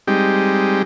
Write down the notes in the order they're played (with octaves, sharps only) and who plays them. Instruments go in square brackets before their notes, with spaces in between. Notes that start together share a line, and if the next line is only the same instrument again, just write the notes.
[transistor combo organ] G3 G#3 C4 D#4 G4